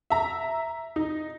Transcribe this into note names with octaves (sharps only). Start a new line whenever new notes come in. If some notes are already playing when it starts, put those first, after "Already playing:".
E5 A#5
D#4